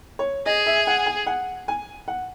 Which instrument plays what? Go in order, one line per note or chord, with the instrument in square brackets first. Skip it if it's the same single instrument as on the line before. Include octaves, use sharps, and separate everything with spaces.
[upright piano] C#5
[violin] G#4 [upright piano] D#5
[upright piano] E5
F#5
G#5
F#5
G#5
F#5